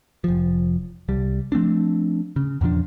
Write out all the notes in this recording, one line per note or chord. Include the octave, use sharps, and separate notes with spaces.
F1 F3
C2 G3
F3 A3 C4 D4
C#3
E2 A#2 F3 D4